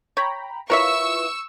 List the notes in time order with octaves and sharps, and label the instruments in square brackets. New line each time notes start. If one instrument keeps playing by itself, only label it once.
[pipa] C#5 [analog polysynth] G5 A#5 B5
[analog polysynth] E4 F4 B4 [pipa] A#4 C#5 E5 [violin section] C#6 E6